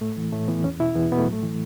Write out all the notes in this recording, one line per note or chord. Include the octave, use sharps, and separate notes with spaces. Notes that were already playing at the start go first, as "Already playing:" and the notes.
A2 A3
E3
A2 A3
E3 B3
E2 C#4
B2 E4
E2 B3
B2 B3
A3
A2 F#3
A3
E3